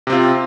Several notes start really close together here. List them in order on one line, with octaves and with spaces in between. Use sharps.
C3 C4 F4